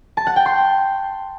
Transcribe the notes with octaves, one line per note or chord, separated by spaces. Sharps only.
A5
F#5
G5
C6